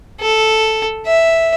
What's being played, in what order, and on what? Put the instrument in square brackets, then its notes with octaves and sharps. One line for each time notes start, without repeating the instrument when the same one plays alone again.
[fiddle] A4
E5